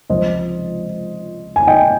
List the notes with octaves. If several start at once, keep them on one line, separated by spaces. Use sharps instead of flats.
C#2 C3 F3 C5 D#5
G#5
D#5 G5